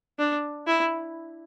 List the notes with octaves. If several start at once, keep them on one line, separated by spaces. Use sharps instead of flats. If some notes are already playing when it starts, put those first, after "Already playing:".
D4
E4